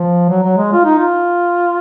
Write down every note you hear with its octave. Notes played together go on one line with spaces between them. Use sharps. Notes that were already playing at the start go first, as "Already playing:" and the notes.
Already playing: F3
F#3
F#3
G#3
F4
D#4
F4